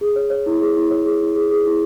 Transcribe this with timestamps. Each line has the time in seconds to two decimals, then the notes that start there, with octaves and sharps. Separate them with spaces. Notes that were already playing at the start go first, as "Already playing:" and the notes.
0.01 G#4
0.16 C#5
0.30 C#5
0.46 E4
0.61 G#4
0.76 E4
0.91 C#5
1.05 G#4
1.21 E4
1.36 G#4
1.51 G#4
1.65 E4